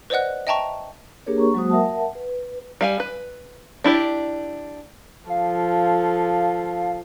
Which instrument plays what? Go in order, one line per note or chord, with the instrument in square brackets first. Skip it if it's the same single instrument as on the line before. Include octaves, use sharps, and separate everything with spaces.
[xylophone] B4 C5 D5 D#5 F#5 F#6
D#5 E5 G5 A5 A#5 C#6
[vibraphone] A#3 D4 G4 G#4 A#4 C#5
A#5 C#6
F#3 G#3 A#3 F#4 C5 D#6
A#4 E5 F#5 A5
B4
[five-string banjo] G3 F5 G#5
B4
D4 E4 G4 D5
[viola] F3 A4 [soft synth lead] F5